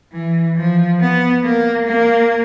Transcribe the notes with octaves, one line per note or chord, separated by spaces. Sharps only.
E3
F3
B3
A#3
A#3